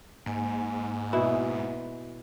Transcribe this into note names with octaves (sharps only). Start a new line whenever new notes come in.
G#2 A#3 G#5
B2 E4